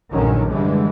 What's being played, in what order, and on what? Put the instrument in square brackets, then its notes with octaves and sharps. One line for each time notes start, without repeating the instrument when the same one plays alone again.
[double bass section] A#1 G2 D3 D#3 F#3 C#4
F#2 A2 D3 E3 G3 G#3